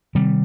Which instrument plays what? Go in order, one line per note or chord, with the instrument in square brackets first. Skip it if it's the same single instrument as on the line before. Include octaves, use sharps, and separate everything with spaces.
[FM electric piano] C3 [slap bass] D#3 G3